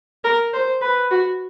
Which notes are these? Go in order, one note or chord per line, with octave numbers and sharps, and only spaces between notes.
A#4
C5
B4
F#4